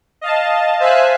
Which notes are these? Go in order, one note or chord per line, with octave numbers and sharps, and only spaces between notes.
D#5 F5 A5
C5 E5 F5 G#5 E6 F#6